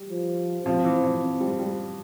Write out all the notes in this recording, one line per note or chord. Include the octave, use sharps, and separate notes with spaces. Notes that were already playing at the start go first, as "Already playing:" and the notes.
Already playing: G3
F3
F3 C4
E3
F3
C4
G3
G3